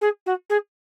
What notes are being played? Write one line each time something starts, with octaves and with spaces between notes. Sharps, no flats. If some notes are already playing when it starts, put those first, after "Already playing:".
G#4
F#4
G#4